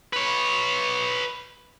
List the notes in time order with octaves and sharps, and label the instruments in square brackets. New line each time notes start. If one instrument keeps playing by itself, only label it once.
[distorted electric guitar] B4 C#5